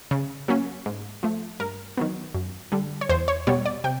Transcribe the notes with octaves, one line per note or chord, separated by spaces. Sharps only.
C#3
F#3 A#3 C#4
G#2
F3 A3
G2 A#4
D#3 F#3 B3
F#2
D3 G3
C#5
E2 C5
C#5
B2 G3 B3 C#5
D5
C3 G5